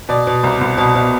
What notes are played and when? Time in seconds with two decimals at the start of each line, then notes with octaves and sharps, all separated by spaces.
0.09 B2 D5
0.27 B2
0.43 C2
0.61 C2
0.78 B2
0.95 B2